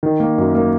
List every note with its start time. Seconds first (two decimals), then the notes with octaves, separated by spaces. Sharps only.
0.03 D#3
0.20 A#3
0.38 F#2
0.55 A#3